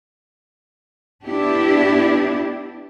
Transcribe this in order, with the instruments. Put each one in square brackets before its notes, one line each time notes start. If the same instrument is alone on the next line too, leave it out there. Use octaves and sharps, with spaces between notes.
[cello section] B3 D4 E4 G4